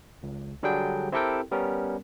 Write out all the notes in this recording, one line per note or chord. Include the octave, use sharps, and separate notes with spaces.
C#2
D3 F#3 G3 D4 G#4 G5
C4 E4 G4 A4 A#4 G5
G3 B3 C#4 A#4